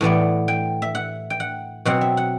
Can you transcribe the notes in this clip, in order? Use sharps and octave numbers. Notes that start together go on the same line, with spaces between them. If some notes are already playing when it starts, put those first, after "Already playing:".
A2 E3 B3 D5
G5
E5
F#5
G5
F#5
B2 F#3 C4 F#5
E5
F#5